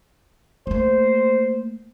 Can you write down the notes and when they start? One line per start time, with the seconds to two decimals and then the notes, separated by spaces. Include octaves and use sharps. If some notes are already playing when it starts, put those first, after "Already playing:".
0.67 A3 A#3 C5